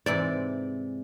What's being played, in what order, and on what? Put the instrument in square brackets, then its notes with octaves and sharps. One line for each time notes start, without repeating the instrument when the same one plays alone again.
[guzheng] G#2 C3 E3 [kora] D5